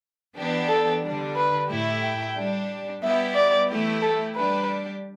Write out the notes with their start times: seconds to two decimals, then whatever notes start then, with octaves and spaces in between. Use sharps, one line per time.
0.36 E3 B3 D4 G4
0.68 A4
1.02 D3 G3 D4
1.36 B4
1.69 A2 A3 E4 G4
2.02 G5
2.36 G3 D4 G4
3.02 G3 B3 E4 G4 E5
3.35 D5
3.69 E3 A3 E4 G4
4.02 A4
4.35 G3 D4 G4 B4